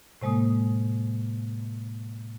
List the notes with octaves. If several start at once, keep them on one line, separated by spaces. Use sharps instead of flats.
A2 C3 G#3 A#3 D#6